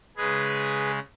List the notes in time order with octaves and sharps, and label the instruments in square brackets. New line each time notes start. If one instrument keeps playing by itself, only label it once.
[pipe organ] C#3 G#3 G#4 B4